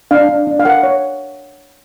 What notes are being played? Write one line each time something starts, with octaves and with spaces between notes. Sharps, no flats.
D4 F5
D4
D4
F5
A#4 F#5
C#5